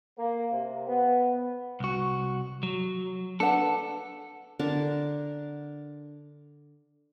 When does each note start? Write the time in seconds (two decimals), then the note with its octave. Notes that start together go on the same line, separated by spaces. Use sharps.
0.17 A#3
0.52 C3
0.87 B3
1.80 C2 F#4
2.63 F#3
3.40 D4 A4 B4 F#5
4.59 D3 D4 A#4 A5